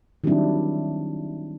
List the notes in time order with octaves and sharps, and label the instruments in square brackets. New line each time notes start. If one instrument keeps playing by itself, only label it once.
[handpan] D#3 F#3 G3 C4 D4 E4